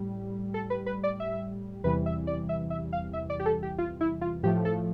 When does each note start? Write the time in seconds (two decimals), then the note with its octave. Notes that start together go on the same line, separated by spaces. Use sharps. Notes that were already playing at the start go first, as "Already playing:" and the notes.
Already playing: A2 G3
0.54 A4
0.70 B4
0.86 B4
1.04 D5
1.20 E5
1.84 E2 C3 E3 G3 B4
2.06 E5
2.27 D5
2.49 E5
2.70 E5
2.93 F5
3.13 E5
3.30 D5
3.40 G4
3.46 A4
3.63 G4
3.78 F4
4.01 E4
4.21 F4
4.43 A2 F3 A3 G4
4.65 A4